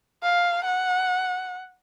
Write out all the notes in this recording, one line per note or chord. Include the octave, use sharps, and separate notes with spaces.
F5
F#5